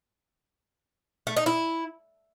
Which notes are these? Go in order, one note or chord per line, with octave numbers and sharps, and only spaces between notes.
A3
D#4
E4